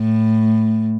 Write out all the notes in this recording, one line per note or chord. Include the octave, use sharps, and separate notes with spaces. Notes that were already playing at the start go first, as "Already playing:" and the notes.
Already playing: A2